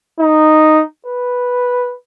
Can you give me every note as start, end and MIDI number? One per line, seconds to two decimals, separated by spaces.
0.20 0.83 63
1.06 1.95 71